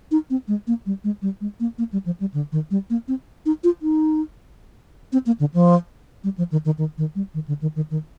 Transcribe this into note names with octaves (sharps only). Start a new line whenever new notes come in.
D#4
C4
G#3
A#3
G3
G#3
G3
G#3
A#3
A#3
G3
F3
G3
D3
D#3
G3
A#3
C4
D#4
F4
D#4
C4
A#3
D3
F3
G3
F3
D#3
D#3
D#3
D#3
G3
D#3
D3
D#3
D#3
D#3